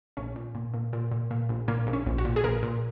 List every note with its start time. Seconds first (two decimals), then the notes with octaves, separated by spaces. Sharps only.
0.17 A#1 C#4
0.36 A#2
0.55 A#2
0.74 A#2
0.93 A#2
1.11 A#2
1.31 A#2
1.49 A#1
1.68 A#2 A#3
1.87 A#1
1.93 C#4
2.06 A#1
2.18 F#4
2.25 A#2
2.36 G#4
2.44 A#1 A#4
2.63 A#2